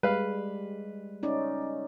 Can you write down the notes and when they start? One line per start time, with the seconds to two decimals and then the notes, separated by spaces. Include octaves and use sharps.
0.03 G3 G#3 B4 F5
1.23 C#4 D#4 D5